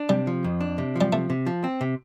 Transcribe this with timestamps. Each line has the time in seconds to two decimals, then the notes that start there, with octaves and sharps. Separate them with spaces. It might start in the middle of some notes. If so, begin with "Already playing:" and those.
Already playing: D4
0.09 C3 G3
0.27 F3
0.44 F2
0.61 D4
0.78 C3
0.96 F3
1.01 G3
1.12 C3 A3
1.30 C3
1.46 F3
1.64 C4
1.81 C3